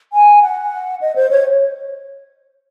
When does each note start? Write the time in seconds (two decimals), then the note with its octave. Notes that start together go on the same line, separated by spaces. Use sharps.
0.13 G#5
0.42 F#5
1.01 D#5
1.16 C5
1.31 C#5